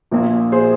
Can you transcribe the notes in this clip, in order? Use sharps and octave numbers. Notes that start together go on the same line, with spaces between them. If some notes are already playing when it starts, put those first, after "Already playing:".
A#1 A#2 A#3
G#4 C5